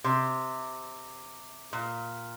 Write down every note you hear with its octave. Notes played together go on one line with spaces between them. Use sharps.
C3
A#2